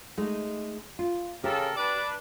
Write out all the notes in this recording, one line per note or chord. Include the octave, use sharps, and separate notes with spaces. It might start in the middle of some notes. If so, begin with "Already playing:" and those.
G#3 A3 D#4
F4
C#3 G4 A4 A#4
D4 B4 D5